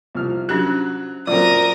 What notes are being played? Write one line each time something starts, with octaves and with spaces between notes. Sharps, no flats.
C2 F3 F6
F#3 C#4 D4 G4 F#6
F#2 A#2 F#3 C4 A#4 D5 D#6